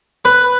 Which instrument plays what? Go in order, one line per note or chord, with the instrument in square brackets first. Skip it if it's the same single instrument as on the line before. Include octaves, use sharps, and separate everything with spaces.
[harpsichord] B4